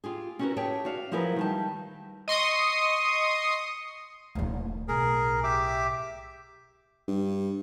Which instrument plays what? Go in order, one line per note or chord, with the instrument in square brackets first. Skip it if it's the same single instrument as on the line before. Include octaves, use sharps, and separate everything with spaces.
[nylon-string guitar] F4 G4 G#4
C#4 E4 F#4 G4 A#4 B4
G4 G#4 C#5 E5 G5 A5
F#4 D5 F5
F3 F#3 E4 G#4 A#4 B4
D#3 G3 A5
[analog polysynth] D#5 C6 C#6 D#6
[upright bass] D1 D#2
[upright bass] B1 A2 [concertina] G#4 A#4
[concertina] G4 E5 D6
[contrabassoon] G2